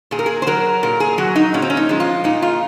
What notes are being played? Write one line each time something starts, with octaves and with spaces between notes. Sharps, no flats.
A#2 G#4
A#4
G#4
C5
F#3 A#4
A#2 A#4
G#4
F#3 F#4
D#4
A#2 C#4
C4
C#4
D#4
F3 G#3
F4
A#2 D#4
F4